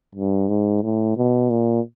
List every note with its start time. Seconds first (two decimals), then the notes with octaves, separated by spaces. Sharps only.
0.15 G2
0.49 G#2
0.83 A2
1.17 B2
1.50 A#2